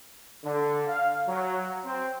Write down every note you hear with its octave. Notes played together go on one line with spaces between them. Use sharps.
D3
F5
F#3
C4